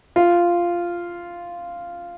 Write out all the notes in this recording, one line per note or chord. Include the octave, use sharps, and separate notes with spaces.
F4